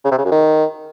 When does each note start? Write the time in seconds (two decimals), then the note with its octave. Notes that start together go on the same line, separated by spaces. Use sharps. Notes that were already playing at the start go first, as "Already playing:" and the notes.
0.04 C#3
0.11 C3
0.18 C#3
0.25 F#2
0.32 D#3